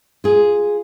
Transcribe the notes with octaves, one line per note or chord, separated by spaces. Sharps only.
F4 G#4